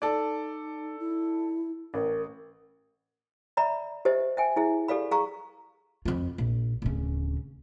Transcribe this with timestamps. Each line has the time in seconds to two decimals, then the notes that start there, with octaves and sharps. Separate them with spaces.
0.02 D#4 A4 D5
0.99 E4
1.94 A1 A#4
3.57 D5 E5 A#5 B5
4.05 G4 C5 D#5 E5
4.37 E5 G5 G#5
4.56 E4 G#4 E5
4.88 G4 A4 D5 F5 B5
5.11 G#4 F5 A#5 C#6
6.05 F2 F4
6.38 A#1
6.82 D1 C#3